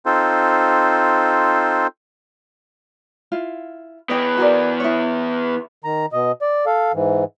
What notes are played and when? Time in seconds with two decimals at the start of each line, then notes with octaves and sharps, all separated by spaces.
0.06 C4 D#4 F4 A4 C5
3.32 E4 F4 F5
4.10 E3 B3 C#5 D#5 G5
4.37 F#4 A#4 D5
4.80 E4 C#5
5.84 D#3 A#5
6.13 B2 D#5
6.42 D5
6.66 A4 F5
6.93 G#2 E3